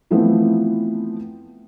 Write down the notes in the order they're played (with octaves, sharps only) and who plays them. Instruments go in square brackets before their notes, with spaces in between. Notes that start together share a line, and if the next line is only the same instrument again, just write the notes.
[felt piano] E3 F3 A3 B3 C4